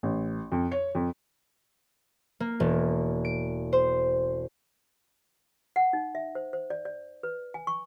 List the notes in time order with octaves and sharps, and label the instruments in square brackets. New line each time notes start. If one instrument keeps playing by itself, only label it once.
[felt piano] A1
F2
C#5
F2
[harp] A#3
E1
D7
C5
[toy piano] F#5
D#4
E5
C5
C5
D5
D5
B4
G#5
C#6